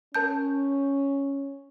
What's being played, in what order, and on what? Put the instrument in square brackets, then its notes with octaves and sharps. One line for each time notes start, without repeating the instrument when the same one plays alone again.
[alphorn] C#4 [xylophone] A#4 A5 G6